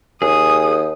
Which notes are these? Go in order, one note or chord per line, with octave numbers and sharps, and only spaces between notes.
D#2 G#4 D#6